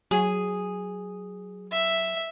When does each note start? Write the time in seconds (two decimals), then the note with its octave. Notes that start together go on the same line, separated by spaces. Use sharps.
0.11 F#3 G#4
1.72 E5